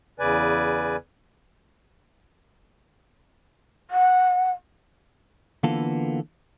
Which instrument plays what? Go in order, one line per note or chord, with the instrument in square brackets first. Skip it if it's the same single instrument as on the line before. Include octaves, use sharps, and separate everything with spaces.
[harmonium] E2 C#3 B4 D5 G#5
[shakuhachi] F#5
[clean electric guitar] D3 E3 A#3 B3 F4 A4